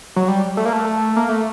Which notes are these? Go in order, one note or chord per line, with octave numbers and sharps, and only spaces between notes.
F#3
G3
A3
A#3
A3
A#3
A3